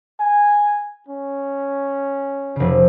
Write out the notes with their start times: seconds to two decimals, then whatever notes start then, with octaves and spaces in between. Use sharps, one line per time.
0.20 G#5
1.08 C#4
2.56 F1 C#3